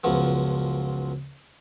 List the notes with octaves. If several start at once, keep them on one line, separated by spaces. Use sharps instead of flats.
C#2 F#2 F3 B3